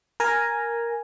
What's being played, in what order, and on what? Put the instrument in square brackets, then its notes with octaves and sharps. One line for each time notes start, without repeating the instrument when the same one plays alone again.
[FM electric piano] A#4 G#5 A#5